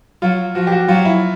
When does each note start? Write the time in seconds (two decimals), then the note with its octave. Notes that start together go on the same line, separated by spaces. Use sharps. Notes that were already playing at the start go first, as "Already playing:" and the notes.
0.22 F#3 F4
0.55 F3 F#4
0.67 G4
0.72 F#4
0.88 F#3 F4
1.05 E4